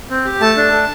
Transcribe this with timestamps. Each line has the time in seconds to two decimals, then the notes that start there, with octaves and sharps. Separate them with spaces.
0.10 C4
0.25 G4
0.40 A3 A5
0.57 D4
0.72 A3